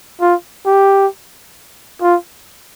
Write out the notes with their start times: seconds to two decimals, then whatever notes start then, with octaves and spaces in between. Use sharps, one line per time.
0.21 F4
0.66 G4
2.02 F4